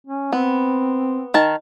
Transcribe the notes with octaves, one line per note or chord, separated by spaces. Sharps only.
C#4
B3 C4
D#3 A5